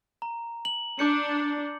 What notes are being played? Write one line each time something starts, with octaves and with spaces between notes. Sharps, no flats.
A#5
F#7
D4 D6 G6 C#7